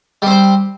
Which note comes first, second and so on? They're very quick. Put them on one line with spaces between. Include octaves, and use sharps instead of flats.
G3 C4 C5